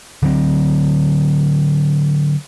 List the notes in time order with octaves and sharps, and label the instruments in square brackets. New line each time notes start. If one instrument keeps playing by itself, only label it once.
[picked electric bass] D3 F#3 C4